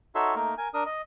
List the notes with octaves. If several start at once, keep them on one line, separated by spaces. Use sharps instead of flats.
D#4 F#4 A4 C#5 E5 C6
A3 A#3 D#4 A#4
A#4 G#5
D4 A#4 D#6
D#5